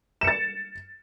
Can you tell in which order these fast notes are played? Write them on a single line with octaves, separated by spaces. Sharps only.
E7 C#7 A6